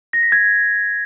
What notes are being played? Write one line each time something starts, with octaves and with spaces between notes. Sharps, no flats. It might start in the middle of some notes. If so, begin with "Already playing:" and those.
A#6
B6
G#6